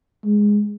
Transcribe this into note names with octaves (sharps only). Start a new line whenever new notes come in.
G#3